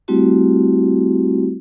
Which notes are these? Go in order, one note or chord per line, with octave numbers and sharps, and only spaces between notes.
G3 A3 C4 E4 F#4 G4